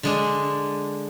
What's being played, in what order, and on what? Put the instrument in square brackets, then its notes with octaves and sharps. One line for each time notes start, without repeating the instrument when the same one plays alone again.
[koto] D3 G#3 D4